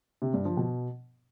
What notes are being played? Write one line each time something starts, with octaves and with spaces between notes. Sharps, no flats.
C3
G2
F3
B2